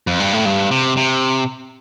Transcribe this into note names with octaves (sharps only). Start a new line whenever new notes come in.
F2
G2
A2
G2
C3
C3